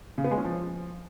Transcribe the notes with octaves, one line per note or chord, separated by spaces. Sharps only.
C#3
B3
G#3
C#4
F3